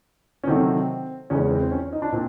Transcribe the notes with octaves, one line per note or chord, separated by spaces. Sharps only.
C#4
C3 D#3 F#3 A3 C4
E2 C#3 E3 G#3 C#4
C#4
C4
C4
C#4
D#4
D4
A#2 C4